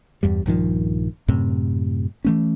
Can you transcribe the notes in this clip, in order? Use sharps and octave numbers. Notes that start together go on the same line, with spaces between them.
E2 G2 G3
A#1 G2 D#3 F3
F#2 A2 C3
E3 A3 C#4